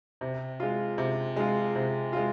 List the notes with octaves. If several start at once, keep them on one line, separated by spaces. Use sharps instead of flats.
C3
G#3 F4
C3
G#3 F4
C3
G#3 F4